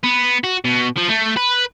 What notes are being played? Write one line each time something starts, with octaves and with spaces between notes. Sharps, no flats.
B3
F#4
B2
F3
A3
B4